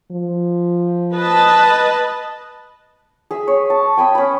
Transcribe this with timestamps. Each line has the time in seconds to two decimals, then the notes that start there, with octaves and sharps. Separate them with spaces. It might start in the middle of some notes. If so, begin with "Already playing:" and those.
0.12 F3
1.16 B4 D#5 A5
3.31 G#4 E5
3.48 C#5
3.70 A5
3.97 G5 G#5 B5 D#6
4.15 C#4 B5